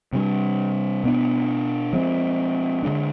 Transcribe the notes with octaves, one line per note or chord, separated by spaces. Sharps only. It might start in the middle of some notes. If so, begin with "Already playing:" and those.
C3 G3 D4
B2 B3 D4
F3 G#3 C4
D3 G#3 D4